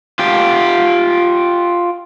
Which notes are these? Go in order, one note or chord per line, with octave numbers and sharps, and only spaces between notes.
F4 G4